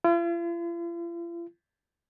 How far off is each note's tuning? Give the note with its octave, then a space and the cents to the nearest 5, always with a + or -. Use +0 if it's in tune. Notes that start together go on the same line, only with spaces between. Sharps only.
F4 -45